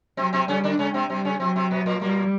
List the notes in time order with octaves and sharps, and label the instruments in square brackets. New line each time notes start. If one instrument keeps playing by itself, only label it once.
[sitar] C3 C4 [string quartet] F#3
[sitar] C3 C4
[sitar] C#3 C#4 [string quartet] G3
[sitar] D3 D4
[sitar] C#3 C#4 [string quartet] G#3
[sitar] C3 C4
[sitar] C3 C4 [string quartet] G3
[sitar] C#3 C#4
[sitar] C3 C4 [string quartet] F#3
[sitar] C3 C4
B2 B3
A#2 A#3
[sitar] A#2 A#3 [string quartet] G3